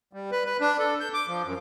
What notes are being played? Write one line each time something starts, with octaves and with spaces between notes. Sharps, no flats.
G3
B4
B4
D4
A4
G6
D6
F3
F#2